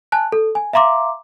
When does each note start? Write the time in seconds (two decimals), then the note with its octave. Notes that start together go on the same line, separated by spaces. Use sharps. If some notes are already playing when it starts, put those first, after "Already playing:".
0.12 G#5 A5 F#6
0.32 A4
0.55 G#5
0.73 E5 F5 A#5 C6 D6